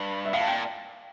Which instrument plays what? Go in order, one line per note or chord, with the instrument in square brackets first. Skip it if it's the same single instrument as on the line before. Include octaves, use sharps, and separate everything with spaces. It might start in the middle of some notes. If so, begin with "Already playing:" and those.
Already playing: [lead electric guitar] G2
[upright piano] E5
[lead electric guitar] A2 [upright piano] F5
[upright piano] A5
[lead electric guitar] A#2 [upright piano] G5